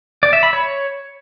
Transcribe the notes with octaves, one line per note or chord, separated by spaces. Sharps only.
D5
E5
B5
C#5